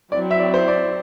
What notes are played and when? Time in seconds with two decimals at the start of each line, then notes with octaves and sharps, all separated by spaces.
0.12 F#3 C4 E4 D5
0.31 E5
0.40 D5
0.54 C5
0.68 D5